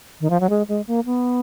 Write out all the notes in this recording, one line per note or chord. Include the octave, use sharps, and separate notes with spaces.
D#3
F3
F#3
G#3
G#3
A#3
B3